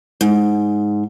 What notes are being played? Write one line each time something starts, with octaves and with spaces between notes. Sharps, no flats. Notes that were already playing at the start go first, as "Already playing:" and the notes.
G#2